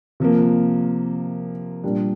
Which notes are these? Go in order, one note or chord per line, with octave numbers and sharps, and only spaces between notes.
C3 F3 A#3
A#2 G3 D4